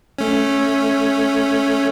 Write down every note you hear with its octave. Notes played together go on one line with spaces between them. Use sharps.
A3 C#4